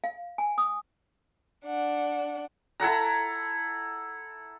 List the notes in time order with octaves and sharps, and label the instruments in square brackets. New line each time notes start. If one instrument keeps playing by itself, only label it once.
[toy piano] F5
G#5
D#6
[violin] D4 F#5
[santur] E4 A4 F#5 A#5